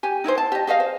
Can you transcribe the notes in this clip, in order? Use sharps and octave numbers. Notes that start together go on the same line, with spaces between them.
G4 G#5
D#4 E4 A4 C5
A5
G4 D#5
G4 G#4 D#5 F5
C5